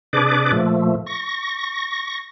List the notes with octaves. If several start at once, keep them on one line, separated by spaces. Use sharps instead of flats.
C3 D4 G#4 B4 D5 D6
A#2 F3 A3
C#6 A#6